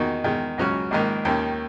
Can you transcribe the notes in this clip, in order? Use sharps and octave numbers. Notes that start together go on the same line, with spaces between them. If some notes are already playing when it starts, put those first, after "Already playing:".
Already playing: E2 D#3 A#3 D#4 F#4
E2 D#3 G#3
C#2 C#3 F#3 C#4 F#4
A#1 G#2 D#3 A#3
D#2 D#3 A#3 C#4